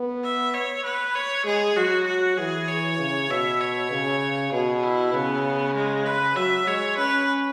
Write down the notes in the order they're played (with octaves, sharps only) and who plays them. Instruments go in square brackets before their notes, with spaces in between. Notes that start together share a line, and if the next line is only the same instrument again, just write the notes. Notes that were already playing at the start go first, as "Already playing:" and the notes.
Already playing: [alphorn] B3
[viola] E5
C#5
B4
C#5
[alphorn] G#3 [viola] G#4
[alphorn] F#3 [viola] F#4
[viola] F#4
[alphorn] E3 [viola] G#4
[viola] C#5
[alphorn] C#3
[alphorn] B2 [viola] E5
[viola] C#5
[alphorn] C#3
[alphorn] B2 [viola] G#4
[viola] E4
[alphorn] C#3 [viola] B3
[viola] G#3
[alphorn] C#3 [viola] B4
[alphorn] F#3 [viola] E5
[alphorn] G#3 [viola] C#5
[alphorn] C#4 [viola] B4